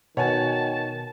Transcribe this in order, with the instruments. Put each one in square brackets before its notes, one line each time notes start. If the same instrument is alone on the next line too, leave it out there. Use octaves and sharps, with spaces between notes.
[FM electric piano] B2 [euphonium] D#3 [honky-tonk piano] C#5 F#5 G#5 [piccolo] A5